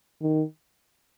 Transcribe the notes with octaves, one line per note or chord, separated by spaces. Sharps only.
D#3